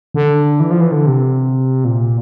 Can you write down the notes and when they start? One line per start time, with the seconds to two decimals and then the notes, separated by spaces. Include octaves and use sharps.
0.14 D3
0.60 E3
0.71 F3
0.81 E3
0.92 D3
1.06 C3
1.85 A#2